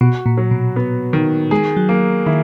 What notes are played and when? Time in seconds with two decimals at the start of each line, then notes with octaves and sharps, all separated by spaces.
0.01 B2 F#4
0.26 A#2
0.37 F#3
0.51 B2
0.76 B3
1.13 D#3
1.51 G#3 G#4
1.77 F#3
1.89 A#3
2.26 D#3 E4